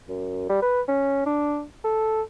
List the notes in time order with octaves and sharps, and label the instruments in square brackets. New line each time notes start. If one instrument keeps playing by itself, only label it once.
[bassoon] F#2
G3
B4
C#4
D4
A4